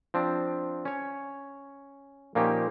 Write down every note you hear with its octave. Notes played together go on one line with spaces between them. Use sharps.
F3 C4 D4
C#4 C#5
A#2 F3 A#3 C#4 D#4 G4